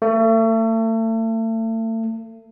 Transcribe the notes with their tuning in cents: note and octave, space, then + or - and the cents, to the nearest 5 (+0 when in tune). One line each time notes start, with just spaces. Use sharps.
A3 +35